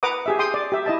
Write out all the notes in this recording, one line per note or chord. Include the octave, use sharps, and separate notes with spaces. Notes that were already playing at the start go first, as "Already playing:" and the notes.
B4 F#5 A#5 D6 D#6
G4 G#4 E5
G5 C6 D#6
D5
G4 E5
E4 D#5 A5